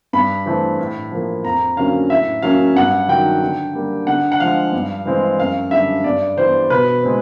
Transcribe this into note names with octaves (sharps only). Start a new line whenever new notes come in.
G2 B5
E3 A3 C4
A2
F3 A#3
F2 A#5
D3 F#3 A#3 C#4 F5
A2 E5
F#3 A#3 C#4 F5
G2 F#5
D#3 F#3 G5
D3
G3 A#3
D3 F#5
F#5
F3 G#3 F5
G2
E3 G#3 C4
F#2 F5
D3 G3 E5
G2 D5
E3 G3 B3 C5
B2 B4
G#3 C4